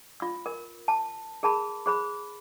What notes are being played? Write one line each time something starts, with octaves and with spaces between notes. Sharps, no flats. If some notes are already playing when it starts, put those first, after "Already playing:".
F4 E6
A#4
A5
G#4 A#4 A5 B5
G#4 C5 B5